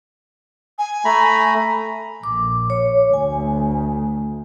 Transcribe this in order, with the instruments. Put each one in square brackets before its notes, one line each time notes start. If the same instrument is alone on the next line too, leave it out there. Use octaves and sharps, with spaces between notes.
[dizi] G#5
[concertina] A3 A#5 B5
[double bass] A#1 [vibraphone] D6
[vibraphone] C#5
[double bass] D2 [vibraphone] G#5